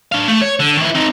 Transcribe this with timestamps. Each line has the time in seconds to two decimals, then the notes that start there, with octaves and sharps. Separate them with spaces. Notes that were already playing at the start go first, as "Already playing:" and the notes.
0.12 D4 F5
0.28 A3
0.42 C#5
0.60 D3
0.77 D#3 E4
0.95 C4 D#4